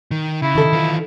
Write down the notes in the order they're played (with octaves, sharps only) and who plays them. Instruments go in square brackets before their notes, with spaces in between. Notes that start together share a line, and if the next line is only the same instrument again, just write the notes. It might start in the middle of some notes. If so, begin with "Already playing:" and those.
[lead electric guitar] D#3
[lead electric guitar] C#3 [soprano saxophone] E4
[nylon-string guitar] D#3 A4
[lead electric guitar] E3 F4